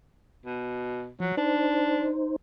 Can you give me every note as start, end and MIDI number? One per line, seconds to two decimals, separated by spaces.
0.45 1.10 47
1.20 1.32 53
1.20 1.37 54
1.37 2.12 62
1.37 2.36 63
1.37 2.36 72